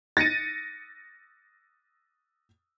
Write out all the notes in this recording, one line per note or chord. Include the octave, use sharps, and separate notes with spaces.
A6 A#6 C#7 D#7